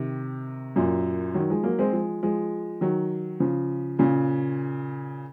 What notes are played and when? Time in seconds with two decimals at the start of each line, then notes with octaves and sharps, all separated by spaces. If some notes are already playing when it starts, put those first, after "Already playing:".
Already playing: C3 D#3
0.76 F#2 A#2
1.34 D#3 F#3
1.50 F3 G#3
1.64 F#3 A#3
1.79 G#3 C4
1.93 F3 G#3
2.23 F3 G#3
2.81 D#3 F#3
3.40 C#3 F3
3.99 A#2 C#3